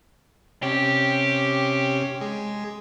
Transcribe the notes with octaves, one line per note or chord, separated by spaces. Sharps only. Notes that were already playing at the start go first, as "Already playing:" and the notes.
C3 C#4 G4
G#3